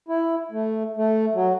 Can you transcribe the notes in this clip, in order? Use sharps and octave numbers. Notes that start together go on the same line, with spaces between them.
E4
A3
A3
F#3